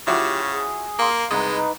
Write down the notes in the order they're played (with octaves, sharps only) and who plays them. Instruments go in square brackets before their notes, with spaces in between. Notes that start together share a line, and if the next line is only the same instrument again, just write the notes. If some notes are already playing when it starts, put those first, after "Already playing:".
[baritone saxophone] C#3 [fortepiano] F3 E4 F#4 [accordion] G4
[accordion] G#4
[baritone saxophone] A#3 [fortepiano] F5 C6
[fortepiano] C2 [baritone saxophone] G#3 [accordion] D#4 B4